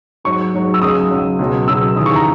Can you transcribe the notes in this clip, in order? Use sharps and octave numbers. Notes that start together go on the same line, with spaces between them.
G#2 F#3 C#6
G#2 F#3
E6
C#2 C#3 F#3 D#6
C#2 C#3 F#3
C#2 B2 F#3
C#2 B2 F#3 E6
D#2 C#3 E3 D#6
C#6
A#5